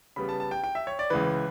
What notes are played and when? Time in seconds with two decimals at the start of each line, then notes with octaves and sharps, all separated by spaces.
0.16 C#3 G3 B3 B5
0.29 A5
0.40 A5
0.51 G5
0.64 G5
0.75 E5
0.87 C#5
0.99 D5
1.10 C#2 C#3 E3 B4